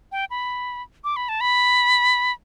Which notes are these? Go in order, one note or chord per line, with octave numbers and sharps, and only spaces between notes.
G5
B5
D6
B5
A5
B5